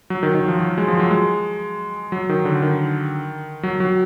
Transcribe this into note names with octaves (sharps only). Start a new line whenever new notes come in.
F#3
D#3
D#3
F3
F#3
G#3
F3
F#3
G#3
F#3
D#3
D3
D#3
F#3
F#3